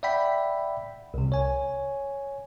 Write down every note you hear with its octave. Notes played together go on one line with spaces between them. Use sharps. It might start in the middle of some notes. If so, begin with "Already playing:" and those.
D5 E5 F#5 G5 B5 B6
C2 C3
C#5 G#5